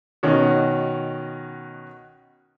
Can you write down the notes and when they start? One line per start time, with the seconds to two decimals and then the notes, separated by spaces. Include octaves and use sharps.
0.23 B2 D#3 C#4 F#4